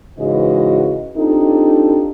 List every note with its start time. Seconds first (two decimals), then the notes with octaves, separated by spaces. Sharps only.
0.18 G#2 C#3 E3 F#4 B4 D#5
1.15 C4 D4 D#4 F4 G4 A4